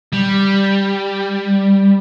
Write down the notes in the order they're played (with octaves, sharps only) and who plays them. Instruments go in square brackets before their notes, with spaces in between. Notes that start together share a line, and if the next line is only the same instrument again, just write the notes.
[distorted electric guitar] G3